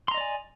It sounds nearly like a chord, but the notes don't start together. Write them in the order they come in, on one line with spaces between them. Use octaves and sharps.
C6 A#5 D#5 D5 G#5